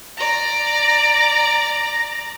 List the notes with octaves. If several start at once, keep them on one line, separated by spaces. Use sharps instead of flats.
D5 A#5